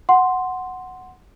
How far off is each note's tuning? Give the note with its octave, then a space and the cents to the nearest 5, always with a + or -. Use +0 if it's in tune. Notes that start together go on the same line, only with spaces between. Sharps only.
F#5 +0 C6 +0